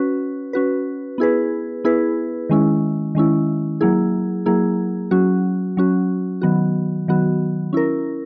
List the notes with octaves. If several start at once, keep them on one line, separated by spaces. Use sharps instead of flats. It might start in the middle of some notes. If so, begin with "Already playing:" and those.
Already playing: C#4 F#4 B4
C#4 F#4 B4
B3 E4 G#4 B4
B3 E4 G#4 B4
D#3 G#3 C#4 E4
D#3 G#3 C#4 E4
F#3 A#3 E4 G#4
F#3 A#3 E4 G#4
F#3 C#4 F#4
F#3 C#4 F#4
D#3 F#3 B3 F#4
D#3 F#3 B3 F#4
C#4 E4 A#4